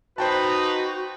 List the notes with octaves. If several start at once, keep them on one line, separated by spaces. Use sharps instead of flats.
D#4 F#4 B4 C5 G5 A5